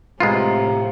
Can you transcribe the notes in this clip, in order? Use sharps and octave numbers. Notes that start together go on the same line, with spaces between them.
A2 C3 G#3 B3 F4 G4 F5 A#5